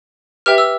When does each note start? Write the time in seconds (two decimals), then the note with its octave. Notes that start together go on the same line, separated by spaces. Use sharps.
0.46 G4 B4 E5 G5 F6
0.58 E6